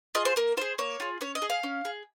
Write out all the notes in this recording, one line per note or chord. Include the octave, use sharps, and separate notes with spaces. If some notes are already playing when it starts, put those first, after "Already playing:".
F4 G#4 D#5
C5
A#3 A#4
F4 G#4 C5
A#3 C#5
F4 G#4
C#4 C#5
D#5
G#4
F5
C#4
G#4